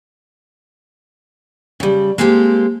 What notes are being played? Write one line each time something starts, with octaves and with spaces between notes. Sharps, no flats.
C#3 G3
G#3 A#3 C4 G4 A4